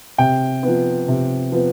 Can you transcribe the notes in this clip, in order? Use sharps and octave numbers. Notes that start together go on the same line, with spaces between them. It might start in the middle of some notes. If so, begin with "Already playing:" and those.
C3 G5
F3 B3
C3
F3 B3